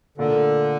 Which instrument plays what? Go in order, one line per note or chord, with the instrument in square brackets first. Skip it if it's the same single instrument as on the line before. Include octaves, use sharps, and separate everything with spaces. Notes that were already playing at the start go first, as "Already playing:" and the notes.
[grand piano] A#2 A3 D4 F4 A#4 [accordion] D3